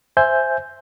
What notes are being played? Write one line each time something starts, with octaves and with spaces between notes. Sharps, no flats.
C5 E5 G#5 G6